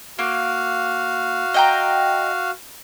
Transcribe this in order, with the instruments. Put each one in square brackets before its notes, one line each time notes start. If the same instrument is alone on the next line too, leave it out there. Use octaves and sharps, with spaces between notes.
[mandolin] A#3 [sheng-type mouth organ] F#4 F5
[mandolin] D#5 G5 A#5